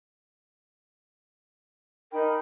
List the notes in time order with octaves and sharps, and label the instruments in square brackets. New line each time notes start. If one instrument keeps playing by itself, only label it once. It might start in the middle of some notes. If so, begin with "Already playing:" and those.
[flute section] D#4 G5 B5 [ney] A#4